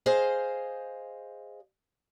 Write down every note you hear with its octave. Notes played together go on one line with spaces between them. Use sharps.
G#4 C5 D#5 F5